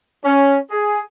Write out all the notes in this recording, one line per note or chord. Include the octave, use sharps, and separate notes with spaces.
C#4
G#4